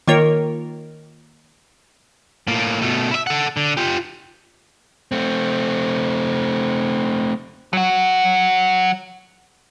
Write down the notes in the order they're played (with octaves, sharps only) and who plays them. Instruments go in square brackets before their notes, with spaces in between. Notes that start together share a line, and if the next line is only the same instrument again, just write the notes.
[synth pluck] D#3 A#3 F4 A#4 C#5
[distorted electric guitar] A2 A#3
B2 A3
E4 E5
A4 F#5
D3
F4 G4
[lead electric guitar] A3 C4
F#3 F#4